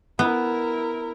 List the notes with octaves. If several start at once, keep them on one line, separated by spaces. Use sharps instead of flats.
B3 E4 A#4